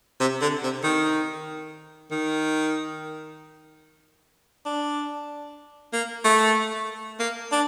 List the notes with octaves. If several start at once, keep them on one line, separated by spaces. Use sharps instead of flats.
C3
D3
C3
D#3
D#3
D4
A#3
A3
A#3
D4